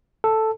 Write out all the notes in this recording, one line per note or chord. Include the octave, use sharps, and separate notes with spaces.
A4